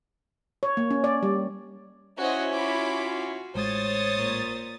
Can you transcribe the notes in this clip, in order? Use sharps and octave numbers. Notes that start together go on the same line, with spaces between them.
C#5
A#3
C#4
D5
G3
C#4 E4 F#4 C5 D#5
F4 F#4 B5 D6
A1 G#3 C5 C#5 D#6 A6
A#2